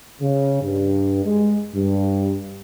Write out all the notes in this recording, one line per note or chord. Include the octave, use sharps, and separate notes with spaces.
C#3
G2
G#3
G2